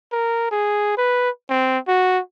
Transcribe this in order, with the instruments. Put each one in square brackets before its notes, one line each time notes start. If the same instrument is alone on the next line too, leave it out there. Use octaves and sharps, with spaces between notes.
[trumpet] A#4
G#4
B4
C4
F#4